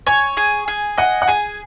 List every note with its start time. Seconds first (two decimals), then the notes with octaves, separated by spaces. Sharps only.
0.07 C#5 G#5
0.37 G#4
0.68 G#4
0.97 D#5 F#5
1.22 F#5
1.28 G#4 G#5